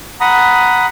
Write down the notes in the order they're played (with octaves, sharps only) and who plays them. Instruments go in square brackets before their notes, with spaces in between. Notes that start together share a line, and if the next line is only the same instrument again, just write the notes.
[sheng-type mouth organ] F#5 A#5 B5 D#6